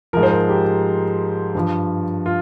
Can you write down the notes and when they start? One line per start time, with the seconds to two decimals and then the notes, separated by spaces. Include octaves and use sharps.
0.13 G#2 F3 A#4
0.23 C5
0.31 A#4
0.49 G4
1.55 G2 F3
2.26 F4